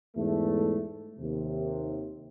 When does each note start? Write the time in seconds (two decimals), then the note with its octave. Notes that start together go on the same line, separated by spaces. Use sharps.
0.16 E2 G#2 A3
1.18 D#2 C3